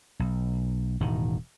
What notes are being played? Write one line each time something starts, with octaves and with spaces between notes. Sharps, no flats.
B1
E1 A2 D#3